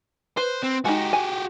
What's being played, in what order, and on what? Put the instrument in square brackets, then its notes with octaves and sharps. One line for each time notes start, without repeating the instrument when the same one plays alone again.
[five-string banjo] B4 [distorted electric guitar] C5
[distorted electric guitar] C4
[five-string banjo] G#3 D#4 [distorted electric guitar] F#4 G4
[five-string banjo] G#5